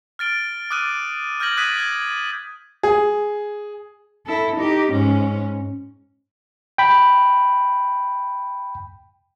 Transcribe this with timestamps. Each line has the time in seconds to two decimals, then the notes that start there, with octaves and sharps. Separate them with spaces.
0.19 F6 A6 D7 G7
0.70 D6 D#6 F6 F#6 A6 D#7
1.40 F6 G6 G#6 A#6 F#7
1.57 D#6 F#6 G#6 A6 B6 D#7
1.77 F6 G#6
2.83 G#4
4.26 E4 A4
4.56 D#4 G4
4.92 G#2 C#4
6.78 G5 B5